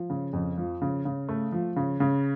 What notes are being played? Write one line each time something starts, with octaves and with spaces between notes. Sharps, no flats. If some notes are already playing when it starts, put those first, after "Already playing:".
Already playing: F3
C#3
F2
F3
C#3
C#3
A3
F3
C#3
C#3